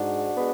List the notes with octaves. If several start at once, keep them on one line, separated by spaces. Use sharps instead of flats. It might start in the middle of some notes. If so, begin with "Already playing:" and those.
Already playing: G#2 D4 F#4
G#3 B3